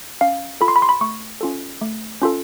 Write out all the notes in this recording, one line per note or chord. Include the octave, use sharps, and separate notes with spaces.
C#4 F5
F4 A4 B5
C6
B5
C6
B5
A3 C#6
C#4 F4 A4
A3
C#4 F4 A4